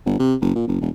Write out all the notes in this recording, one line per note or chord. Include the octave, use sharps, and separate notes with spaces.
G1
C3
F#1
A#2
F#1
E1